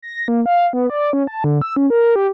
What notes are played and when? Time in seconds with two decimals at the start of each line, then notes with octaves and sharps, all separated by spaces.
0.02 A#6
0.28 A#3
0.46 F5
0.73 B3
0.90 D5
1.13 C#4
1.27 A5
1.44 D3
1.61 E6
1.76 C#4
1.90 A#4
2.16 G4